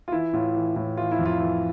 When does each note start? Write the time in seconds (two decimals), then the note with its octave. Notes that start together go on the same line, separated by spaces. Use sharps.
0.08 F4
0.12 E3 E4
0.33 A2 F4
0.55 E3
0.76 A2
0.97 E3 F4
1.12 E4
1.19 F2
1.26 F4
1.40 E3